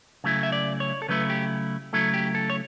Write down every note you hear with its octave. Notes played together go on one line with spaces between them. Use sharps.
C#3 F#3 A3 E4
E5
D5
C#5
A4
C#3 F#3 A3 E4 B4
G4
C#3 F#3 A3 E4 A4
G4
A4
C#5